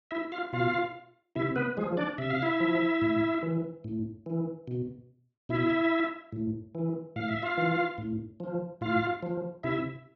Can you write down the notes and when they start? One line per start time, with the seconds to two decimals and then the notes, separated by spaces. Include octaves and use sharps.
0.11 E4 E5
0.32 F4 F5
0.53 B2 F4 F5
1.35 C3 E4 E5
1.56 B3 B4
1.77 F3 G#3 G#4
1.97 D4 D5
2.18 C3 E5
2.30 F5
2.42 E4 E5
2.60 F3
3.02 A2
3.43 E3
3.84 A2
4.26 E3
4.68 B2
5.49 B2 E4 E5
6.32 A2
6.75 E3
7.16 A2 F5
7.29 E5
7.42 F4 F5
7.57 E3
7.98 A2
8.40 F3
8.81 A2 F4 F5
9.23 F3
9.63 C3 E4 E5